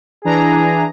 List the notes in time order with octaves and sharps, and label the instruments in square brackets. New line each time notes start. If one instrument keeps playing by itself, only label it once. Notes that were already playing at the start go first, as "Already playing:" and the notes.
[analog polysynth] E3 D4 A#5 [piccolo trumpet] G#4